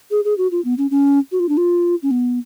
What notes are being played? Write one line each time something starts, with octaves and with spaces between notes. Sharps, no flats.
G#4
G#4
F#4
F4
B3
C#4
C#4
F#4
F4
D4
F4
C#4
B3